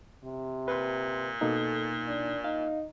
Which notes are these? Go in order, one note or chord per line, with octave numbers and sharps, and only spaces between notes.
C3
A#2 B4 C6
B2 A#3 D#4 A4
D4
D#4 F5